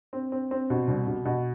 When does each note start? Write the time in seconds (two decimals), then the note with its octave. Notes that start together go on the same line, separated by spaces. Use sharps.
0.13 C4
0.32 C4
0.51 C4
0.70 B2
0.88 C2
1.07 B2
1.25 B2